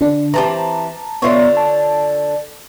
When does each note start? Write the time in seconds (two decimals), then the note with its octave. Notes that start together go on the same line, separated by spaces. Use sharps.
0.01 D3 D4
0.34 E3 C4 G4 A5 A#5
1.22 D3 B3 F4 C#5 E5 C6
1.57 A5